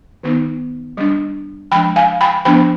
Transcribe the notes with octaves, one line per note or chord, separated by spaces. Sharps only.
D#3 B3 D#4
G3 D4
F3 G#3 D4 G5 B5
F5 G#5
G5 B5
F3 B3 D4 G5 B5